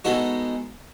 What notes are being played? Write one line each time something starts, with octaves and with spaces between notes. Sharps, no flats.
G#3 B3 D#4 F#4 A4